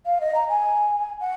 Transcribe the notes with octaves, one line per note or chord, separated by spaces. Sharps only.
F5
D#5
A#5
G#5
F#5